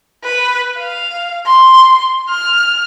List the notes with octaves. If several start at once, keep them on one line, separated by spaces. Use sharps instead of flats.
B4
F5
C6
F6